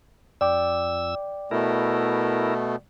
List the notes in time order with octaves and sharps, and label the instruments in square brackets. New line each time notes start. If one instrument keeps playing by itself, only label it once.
[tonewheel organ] F2 E6 [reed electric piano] D5 G5 D6
[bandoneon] B2 A3 [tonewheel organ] E4 A#4